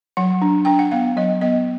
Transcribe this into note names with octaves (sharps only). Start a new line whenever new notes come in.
F#3 F#5
D4
D4 G5
F#5
B3 F5
F#3 D#5
B3 D#5